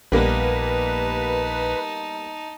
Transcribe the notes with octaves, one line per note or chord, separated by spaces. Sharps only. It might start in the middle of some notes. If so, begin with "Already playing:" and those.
A#1 G3 A#3 B3 D#4 B4 A5